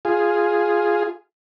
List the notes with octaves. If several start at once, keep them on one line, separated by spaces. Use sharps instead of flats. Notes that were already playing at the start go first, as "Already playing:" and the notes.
F4 G#4